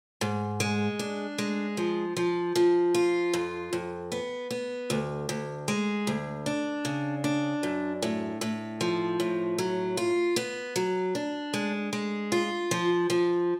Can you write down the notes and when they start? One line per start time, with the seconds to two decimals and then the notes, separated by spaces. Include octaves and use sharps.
0.21 G#2
0.60 G#3
0.99 D4
1.38 G#3
1.77 F3
2.16 F3
2.55 F3
2.94 F4
3.34 F2
3.73 F2
4.12 B3
4.51 B3
4.90 D2
5.29 D2
5.68 G#3
6.07 D2
6.46 D4
6.85 C#3
7.24 D4
7.63 F#2
8.02 A2
8.41 A2
8.81 F3
9.20 A2
9.58 F#3
9.97 F4
10.36 B3
10.76 F#3
11.15 D4
11.54 G#3
11.93 G#3
12.32 F4
12.71 F3
13.10 F3